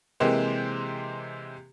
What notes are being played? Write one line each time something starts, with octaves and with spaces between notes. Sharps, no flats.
C3 E3 G#3 A#3 G4 C5